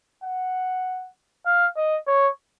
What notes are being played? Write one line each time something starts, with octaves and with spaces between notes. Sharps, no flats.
F#5
F5
D#5
C#5